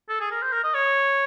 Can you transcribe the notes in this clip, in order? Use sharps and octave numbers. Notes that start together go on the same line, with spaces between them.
A4
G#4
A#4
C5
A#4
D#5
C#5